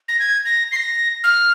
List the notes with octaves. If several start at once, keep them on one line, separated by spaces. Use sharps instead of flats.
A#6
G#6
A#6
C7
A#6
F6